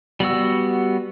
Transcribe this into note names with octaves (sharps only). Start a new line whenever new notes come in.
G3 B3 F#4 E6